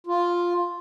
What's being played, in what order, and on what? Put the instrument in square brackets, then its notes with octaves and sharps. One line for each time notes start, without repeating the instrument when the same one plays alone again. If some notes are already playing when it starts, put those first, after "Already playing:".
[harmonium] F4